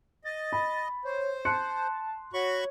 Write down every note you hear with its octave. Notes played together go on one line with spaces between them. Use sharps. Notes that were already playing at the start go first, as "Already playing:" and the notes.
D#5 A6
B5
C5 C#5
A5 C6 F#6 C#7
F#4 C#5 B5 C#6